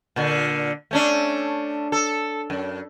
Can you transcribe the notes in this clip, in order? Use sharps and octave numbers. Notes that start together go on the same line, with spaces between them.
A#2 D3
A3 C#4 D4
A4
F#2